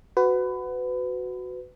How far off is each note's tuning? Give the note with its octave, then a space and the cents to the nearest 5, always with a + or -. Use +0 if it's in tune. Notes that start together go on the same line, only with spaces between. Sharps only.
F#4 +0 B4 +25